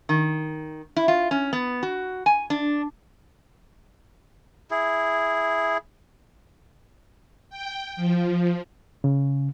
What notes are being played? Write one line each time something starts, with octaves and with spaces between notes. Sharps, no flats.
D#3
E4
F4
C#4
B3
F#4
G#5
D4
E4 G#4
G5
F3
C#3